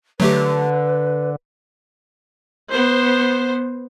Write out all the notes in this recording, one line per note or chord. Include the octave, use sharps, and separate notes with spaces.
D3 F#3 A3 G4 B4
B3 C5